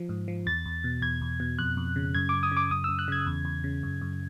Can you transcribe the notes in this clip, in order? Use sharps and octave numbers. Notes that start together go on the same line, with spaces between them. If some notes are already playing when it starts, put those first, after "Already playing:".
Already playing: F3
G#2
F3
E2 A6
E2
B2
E2 G#6
E2
B2
F2 F#6
F2
C#3
F#2 G#6
F#2 D6
D#6
C#3
D6
F#2 D#6
F#2 E6
F#6
C#3 G#6
E2
E2
C#3
F#2
F#2